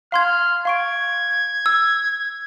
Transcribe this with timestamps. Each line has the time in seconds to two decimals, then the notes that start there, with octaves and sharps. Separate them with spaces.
0.12 F5 C6 F6 G#6
0.65 F5 C#6 G#6 D7
1.66 E6